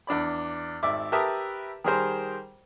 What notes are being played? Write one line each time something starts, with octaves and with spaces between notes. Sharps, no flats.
E2 D4 D5 B5
G#1 D5 E5 D6
G4 A#4 B4 E5 A5 D#6
D#3 G3 G#4 A#4 C5